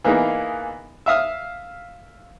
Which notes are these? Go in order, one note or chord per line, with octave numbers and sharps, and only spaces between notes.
E3 A#3 B3 D#4 G#4
E5 F5 D#6 F6